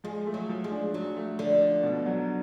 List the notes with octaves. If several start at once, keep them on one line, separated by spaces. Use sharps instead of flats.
F3 G#3
A3
F#3
F3
G#3
D4
F3 F#3
A3
D3 F3
D4
B2
F#3